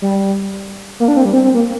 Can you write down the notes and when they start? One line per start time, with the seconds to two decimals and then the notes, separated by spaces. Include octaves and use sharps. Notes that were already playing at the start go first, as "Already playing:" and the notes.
0.02 G3
1.00 A#3
1.08 D4
1.17 C4
1.25 G3
1.33 C4
1.44 C4
1.55 A#3